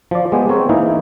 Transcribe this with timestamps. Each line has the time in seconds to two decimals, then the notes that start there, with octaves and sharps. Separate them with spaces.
0.11 F3 D5
0.32 G#3 B3 G4 G#4
0.49 C4 A#4 C#5
0.69 E3 A#3 D#4 E4